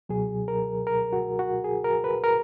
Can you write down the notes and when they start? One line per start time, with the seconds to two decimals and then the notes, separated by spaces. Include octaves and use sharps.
0.09 C#2 B2 F#3 G#4
0.48 A#4
0.87 A#4
1.13 F#4
1.39 F#4
1.64 G#4
1.84 A#4
2.04 B4
2.24 A#4